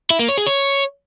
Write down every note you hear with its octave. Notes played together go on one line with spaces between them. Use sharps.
E4
A#3
C#5
G#4
C#5